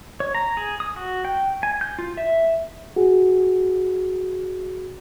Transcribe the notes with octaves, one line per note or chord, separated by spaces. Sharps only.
C#5
A#5
G#4
D#6
F#4
G5
G#5
G6
F4
E5
F#4 G#4